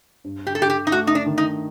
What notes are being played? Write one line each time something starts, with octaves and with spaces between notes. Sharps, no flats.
G2
G4
A4
G2 G4
G4
D#4
A3 F#4
D#4
D4
D#3
D#4